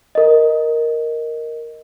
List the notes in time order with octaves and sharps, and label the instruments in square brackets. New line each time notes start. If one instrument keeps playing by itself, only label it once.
[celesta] A#4 D#5